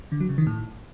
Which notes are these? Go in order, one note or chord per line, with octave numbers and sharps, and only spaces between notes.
D3
F#3
C#3
D#3
A2